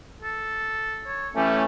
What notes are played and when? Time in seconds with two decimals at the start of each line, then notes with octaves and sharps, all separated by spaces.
0.22 A4
1.07 C#5
1.36 E3 A3 C#4 G4